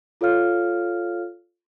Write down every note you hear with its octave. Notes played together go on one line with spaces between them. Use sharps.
F4 A4 C#5 F5 F6